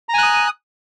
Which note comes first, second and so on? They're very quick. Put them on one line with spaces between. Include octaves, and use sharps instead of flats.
A#5 G#5 F#6 D#6